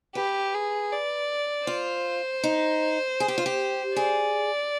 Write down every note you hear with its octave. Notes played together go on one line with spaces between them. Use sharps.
G4 B4
G#4
D5
F4 C5
D#4
G#4
G4
F4
G4
G#4 D5